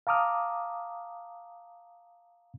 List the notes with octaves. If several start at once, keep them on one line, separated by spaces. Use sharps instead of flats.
F5 A5 A#5 D6 D#6 F6